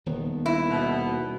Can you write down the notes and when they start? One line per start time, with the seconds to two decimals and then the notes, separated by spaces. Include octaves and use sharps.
0.06 D#1 D#3 B3
0.46 E4
0.69 B2